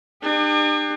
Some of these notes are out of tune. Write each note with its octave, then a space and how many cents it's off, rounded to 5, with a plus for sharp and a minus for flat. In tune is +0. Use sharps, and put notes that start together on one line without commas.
D4 +45 G4 +35